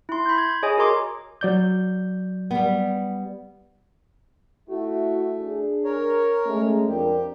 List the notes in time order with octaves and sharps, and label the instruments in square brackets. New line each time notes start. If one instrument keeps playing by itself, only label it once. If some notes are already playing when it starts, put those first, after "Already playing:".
[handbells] E4 C6
B5 G6
G#6
G#4 C#5 D#5 G#5 D#6
F#4 A#4 A#5 C6 D6
[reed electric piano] F#3 D5 G6
[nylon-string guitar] G3 B3
[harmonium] A3 [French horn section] E4 F#4
[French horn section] D4 G#4
[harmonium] A#4 C#5
[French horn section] G#3 A3 C#4
[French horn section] F2 D4 A#4 [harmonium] G4